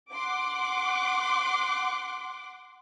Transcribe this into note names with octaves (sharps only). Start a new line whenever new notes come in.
F#5 C6 D6